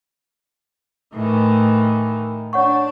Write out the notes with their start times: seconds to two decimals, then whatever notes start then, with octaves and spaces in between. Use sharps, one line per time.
1.14 A2 D#3 E3
2.53 D4 C#5 F#5 C#6